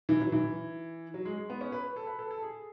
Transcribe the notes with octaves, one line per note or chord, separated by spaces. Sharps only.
E3
F#3
E3
F#3
G#3
G#3
B3
C#4
B4
A4
B4
A4
A4
G#4